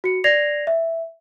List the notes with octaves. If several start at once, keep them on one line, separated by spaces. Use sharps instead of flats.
F#4 C#7
D5 G#6 A#6 C7 F7
E5